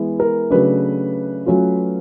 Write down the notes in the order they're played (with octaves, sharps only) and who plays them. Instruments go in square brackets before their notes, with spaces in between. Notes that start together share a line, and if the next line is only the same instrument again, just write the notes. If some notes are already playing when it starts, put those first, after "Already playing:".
Already playing: [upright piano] E3 G#3 B3 E4
A#4
C#3 F#3 A3 D4 B4
F#3 A3 C#4 F4